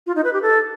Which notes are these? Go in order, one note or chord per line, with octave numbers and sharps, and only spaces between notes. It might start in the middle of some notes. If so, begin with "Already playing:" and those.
F4
D#4
B4
G4
A4